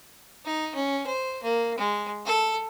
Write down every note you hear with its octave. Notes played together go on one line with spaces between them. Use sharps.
D#4
C#4
C5
A#3
G#3
A4